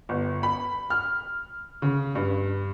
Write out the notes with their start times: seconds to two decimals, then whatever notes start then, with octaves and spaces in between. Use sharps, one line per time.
0.09 G1
0.43 B5
0.90 F6
1.82 C#3
2.15 G2